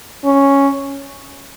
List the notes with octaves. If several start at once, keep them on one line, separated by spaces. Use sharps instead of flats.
C#4